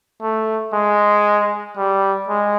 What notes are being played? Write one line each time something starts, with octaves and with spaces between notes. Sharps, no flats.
A3
G#3
G3
G#3